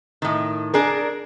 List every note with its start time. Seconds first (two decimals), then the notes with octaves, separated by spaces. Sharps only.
0.22 A2 D#3
0.74 D4 G#4 A#4